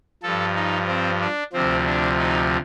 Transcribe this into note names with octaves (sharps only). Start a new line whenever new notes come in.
G2 F3 A4
D#4
C4
D4
D2 C3 F3 C4
D4
D#4